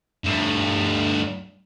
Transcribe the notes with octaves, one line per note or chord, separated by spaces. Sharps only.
G2 A3